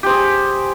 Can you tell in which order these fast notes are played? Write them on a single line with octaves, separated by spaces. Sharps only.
G4 C5 G#4